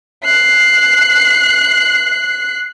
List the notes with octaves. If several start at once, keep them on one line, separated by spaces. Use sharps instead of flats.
F#6 C7